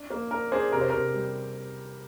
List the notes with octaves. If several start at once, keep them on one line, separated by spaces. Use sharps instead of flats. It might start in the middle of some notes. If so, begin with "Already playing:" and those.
Already playing: D4
A#3
D4 A#4
D4 G#4 C5
C3 A#4
C5
C3 A#4
G3